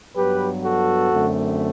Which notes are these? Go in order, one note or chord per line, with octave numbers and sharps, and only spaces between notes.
G2 F#3 B3 G4 B4
F#4 A4
F#2 D3 A3 C4